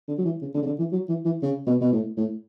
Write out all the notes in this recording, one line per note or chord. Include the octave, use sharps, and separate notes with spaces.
D3
F#3
E3
C#3
D3
C#3
D3
E3
F#3
E3
E3
C#3
B2
B2
A2
A2